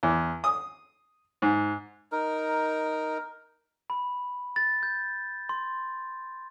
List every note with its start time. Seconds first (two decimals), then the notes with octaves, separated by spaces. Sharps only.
0.03 E2
0.44 D#6
1.42 G#2
2.12 D#4 A#4
3.90 B5
4.56 A6
4.83 G6
5.49 C6